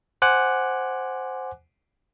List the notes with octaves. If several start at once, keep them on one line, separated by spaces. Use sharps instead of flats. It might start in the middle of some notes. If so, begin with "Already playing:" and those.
C5 F#5 G#5 D6 F#6